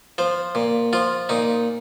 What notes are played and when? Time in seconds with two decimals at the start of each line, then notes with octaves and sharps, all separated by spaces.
0.18 F3 C5
0.55 A#2
0.93 F3 F4
1.29 A#2 D#4